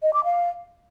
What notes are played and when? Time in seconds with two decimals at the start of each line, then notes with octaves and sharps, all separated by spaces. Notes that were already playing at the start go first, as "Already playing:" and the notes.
0.02 D#5
0.13 D6
0.24 F5